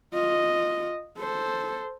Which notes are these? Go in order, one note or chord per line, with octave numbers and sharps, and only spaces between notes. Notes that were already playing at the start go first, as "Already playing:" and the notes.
F4 D#5
A4 C5